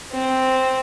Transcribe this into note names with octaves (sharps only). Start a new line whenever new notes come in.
C4